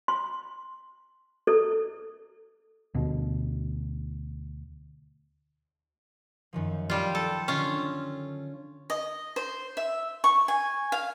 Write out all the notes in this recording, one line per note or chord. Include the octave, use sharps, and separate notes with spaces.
C6
A4
D2 B2
F#2 D#3 F3
G3 F4 G4 F5 G5
A4 A5
D3 C#4 F4
D#5
C5
E5
C#6
G#5
F5